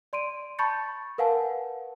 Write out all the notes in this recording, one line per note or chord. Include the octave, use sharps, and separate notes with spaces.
D5 C6 D7 D#7
A5 B5 C#6 G6 A6 C#7
A#4 B4 F5 F#5 G#5 A5